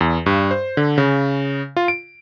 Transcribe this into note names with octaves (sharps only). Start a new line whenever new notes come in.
E2
G2
C5
D3
C#3
F4
D7